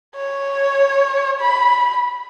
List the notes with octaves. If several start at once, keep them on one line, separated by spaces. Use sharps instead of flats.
C#5
B5